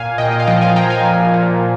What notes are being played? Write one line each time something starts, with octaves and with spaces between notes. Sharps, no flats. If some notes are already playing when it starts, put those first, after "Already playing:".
Already playing: A#2 F5 G#5
A#2 D#5 G5
D#5
F5
F3 D#5 G5
F5 G#5
F3 G5 A#5
F5 G#5
A#2
A#2